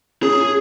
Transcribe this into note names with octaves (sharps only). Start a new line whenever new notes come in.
C#4 G#4